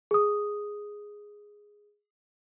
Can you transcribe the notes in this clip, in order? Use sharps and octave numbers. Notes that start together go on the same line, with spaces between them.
G#4 D#6